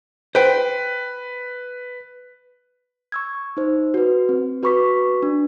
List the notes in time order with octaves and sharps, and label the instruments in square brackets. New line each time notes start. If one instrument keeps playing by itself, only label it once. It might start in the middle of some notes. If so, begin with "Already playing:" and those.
[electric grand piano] B4 [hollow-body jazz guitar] C5 G5
[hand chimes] C#6 E6 G#6
D#4 C5
F#4 B4
C4
F#4 B4 B5 C#6 D6 B6
D4